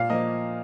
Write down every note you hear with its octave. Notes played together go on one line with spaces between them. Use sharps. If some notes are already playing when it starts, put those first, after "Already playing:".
Already playing: A#2 F5
F3 A#3 D#5